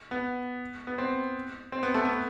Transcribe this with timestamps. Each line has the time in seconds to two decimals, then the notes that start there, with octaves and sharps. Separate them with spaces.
0.11 B3
0.87 B3
0.98 C4
1.72 C4
1.83 B3
1.94 A3
2.05 B3